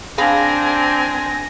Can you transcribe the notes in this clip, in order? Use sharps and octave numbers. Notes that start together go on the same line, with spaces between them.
C4 D4 G#4 F5 G#5 B5 A#6